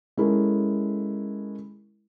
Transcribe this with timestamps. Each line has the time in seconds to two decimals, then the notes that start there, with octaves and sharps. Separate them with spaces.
0.17 G#3 C#4 E4 A4 A#4